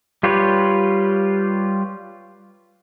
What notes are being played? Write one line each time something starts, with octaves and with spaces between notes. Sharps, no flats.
G3 F4 G4 B4 C#5